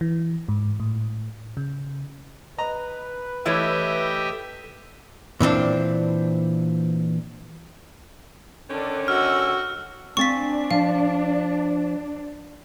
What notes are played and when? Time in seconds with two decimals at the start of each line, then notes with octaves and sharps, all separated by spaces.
0.01 E3
0.49 G#2
0.80 A2
1.57 C#3
2.58 B4 D#5 A#5
3.46 E3 A3 E4 G4 C#5 D#5 E5
5.40 A#2 E3 C4 D4
8.70 D3 D#3 C#4 D4 A4
9.08 F#4 D#5 E6 F6
10.17 C4 D4 F5 G#5 C#6 A6 B6
10.71 F3 F5